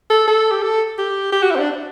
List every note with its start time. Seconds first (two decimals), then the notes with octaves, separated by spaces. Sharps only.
0.10 A4
0.28 A4
0.51 G4
0.62 A4
0.98 G4
1.32 G4
1.42 F#4
1.51 E4
1.56 C4
1.59 D4